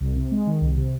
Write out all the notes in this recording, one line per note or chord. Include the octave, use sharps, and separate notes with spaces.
C2
C3
G#3
D#3
C2
C3